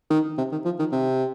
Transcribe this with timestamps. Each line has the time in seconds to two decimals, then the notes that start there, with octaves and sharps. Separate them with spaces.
0.10 D#3
0.38 C3
0.52 D#3
0.65 F3
0.79 D#3
0.92 C3